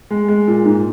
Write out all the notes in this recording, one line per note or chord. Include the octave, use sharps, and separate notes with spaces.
G#3
G#3
A#2
G#2